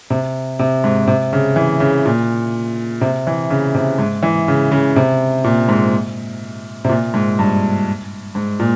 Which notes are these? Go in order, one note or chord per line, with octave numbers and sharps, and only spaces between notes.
C3
C3
G#2
C3
C#3
E3
C#3
A#2
C3
E3
C#3
C3
G#2
E3
C#3
C#3
C3
A#2
G#2
C3
A#2
G#2
G2
G#2
A#2